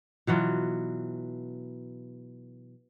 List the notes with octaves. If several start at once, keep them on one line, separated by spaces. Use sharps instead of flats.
B2 E3 F#3 F4